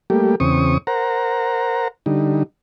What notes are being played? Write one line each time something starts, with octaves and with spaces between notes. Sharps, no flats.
G3 A3 A#3 G4
E2 C#3 C4 C#6 D#6
A#4 C5 F#5 A#5
D3 G3 D#4